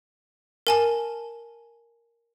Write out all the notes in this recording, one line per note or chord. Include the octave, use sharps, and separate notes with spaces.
A#4 G#5 A5